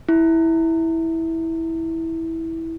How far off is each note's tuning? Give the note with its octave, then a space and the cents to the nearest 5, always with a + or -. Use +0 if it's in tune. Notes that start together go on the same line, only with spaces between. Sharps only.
E4 -15